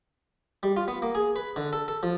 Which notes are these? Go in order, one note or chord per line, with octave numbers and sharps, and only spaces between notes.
G3
F4
B3
A#3
G#4
B4
D3
A4
A4
F3